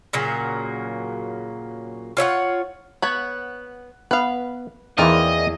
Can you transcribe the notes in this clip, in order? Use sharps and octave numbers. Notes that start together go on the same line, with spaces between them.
A#2 C#3 F#3 A#3
F4 C#5 E5 F#5
B3 C#5 F#5 B5
B3 B4 F5
E2 E3 A#3 C4 D#4 A#4 D5 D#5